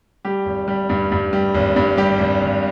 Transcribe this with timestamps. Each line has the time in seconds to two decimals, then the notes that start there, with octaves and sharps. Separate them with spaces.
0.25 G3 G4
0.45 G#1
0.68 G3
0.89 G2
1.12 G2
1.33 G3
1.54 G#1
1.76 G2
1.97 G3 G4
2.19 G#1
2.42 G#1